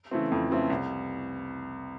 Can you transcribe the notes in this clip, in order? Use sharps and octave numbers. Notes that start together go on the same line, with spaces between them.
C#3 E3 A3 C4
F2
C#3 E3 A3 C4
C2